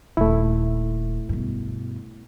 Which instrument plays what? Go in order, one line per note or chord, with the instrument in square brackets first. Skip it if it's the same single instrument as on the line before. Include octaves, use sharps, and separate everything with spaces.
[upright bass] D#1 [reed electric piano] A3 E4
[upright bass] G2 B2